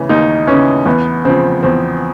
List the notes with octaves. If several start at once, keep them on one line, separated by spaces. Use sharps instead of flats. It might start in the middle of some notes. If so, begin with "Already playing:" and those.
Already playing: C#3 E3 C#4
D#2 D#4
C#3 E3 C#4
E2 B3
C#3 F3 C4
E2 C4